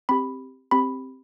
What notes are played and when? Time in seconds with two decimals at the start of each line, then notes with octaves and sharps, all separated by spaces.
0.09 C4 G4 B5
0.71 C4 G4 B5